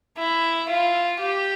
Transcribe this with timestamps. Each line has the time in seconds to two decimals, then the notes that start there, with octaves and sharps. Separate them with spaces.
0.17 E4
0.69 F4
1.20 G4